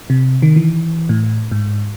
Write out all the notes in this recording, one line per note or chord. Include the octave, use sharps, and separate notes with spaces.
C3
D#3
E3
A2
G#2